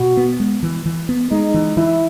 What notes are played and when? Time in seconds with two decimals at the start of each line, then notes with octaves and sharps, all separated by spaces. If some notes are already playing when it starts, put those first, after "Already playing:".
Already playing: B2 F#4
0.17 B3
0.40 G#3
0.63 E3
0.86 E3
1.09 B3
1.31 G#3 D#4
1.54 E3
1.77 E3 E4